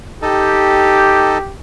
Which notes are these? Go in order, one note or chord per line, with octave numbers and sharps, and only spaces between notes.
D#4 G4 A4